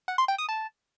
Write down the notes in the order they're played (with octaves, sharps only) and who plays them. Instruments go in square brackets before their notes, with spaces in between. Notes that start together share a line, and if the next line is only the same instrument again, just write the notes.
[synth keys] F#5
C6
G5
D#6
A5